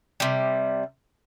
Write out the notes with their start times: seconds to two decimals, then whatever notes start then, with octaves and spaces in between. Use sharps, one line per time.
0.20 C3 G3